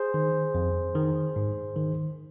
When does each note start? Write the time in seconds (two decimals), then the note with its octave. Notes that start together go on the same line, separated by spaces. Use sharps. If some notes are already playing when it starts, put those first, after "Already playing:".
Already playing: G#4 C5
0.14 D#3
0.55 F2
0.95 D#3
1.36 G#2
1.76 D#3